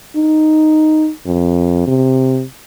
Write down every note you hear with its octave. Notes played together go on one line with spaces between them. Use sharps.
D#4
F2
C3